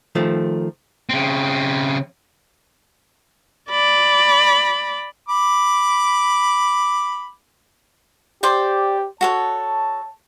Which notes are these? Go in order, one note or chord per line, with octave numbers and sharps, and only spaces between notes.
D#3 F3 A3
C#3 C4
D5 B5
B5 D6
G4 C5 D5 G5
F#4 A4 C#5 A5